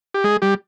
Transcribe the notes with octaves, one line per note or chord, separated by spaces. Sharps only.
G4
G#3 G#4
G3 G4